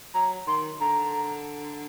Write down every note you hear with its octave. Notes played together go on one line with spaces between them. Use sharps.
F#3 A#5
D#3 C6
D3 A#5